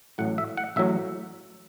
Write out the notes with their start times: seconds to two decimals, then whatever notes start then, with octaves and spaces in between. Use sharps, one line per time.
0.18 A1 A2 F#3 F#5
0.38 E5
0.57 F#5
0.76 A1 A2 F#3 E5